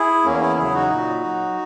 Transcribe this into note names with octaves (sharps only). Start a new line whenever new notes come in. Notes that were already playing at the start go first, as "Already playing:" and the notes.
Already playing: E4 G#4
E2 A#3 C#4
C#4 E4
C#3 F#3 E4 G#4
D#4 F#4
A#2
F#3